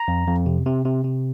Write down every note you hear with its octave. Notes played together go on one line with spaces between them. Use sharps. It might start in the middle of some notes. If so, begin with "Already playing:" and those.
Already playing: A#5
F2
F2
C3
C3
C3
C3